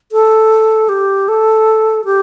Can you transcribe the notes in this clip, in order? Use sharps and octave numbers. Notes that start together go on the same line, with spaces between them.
A4
G4
A4
G4